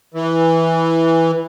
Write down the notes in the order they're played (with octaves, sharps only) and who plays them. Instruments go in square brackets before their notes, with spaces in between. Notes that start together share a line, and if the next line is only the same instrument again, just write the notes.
[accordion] E3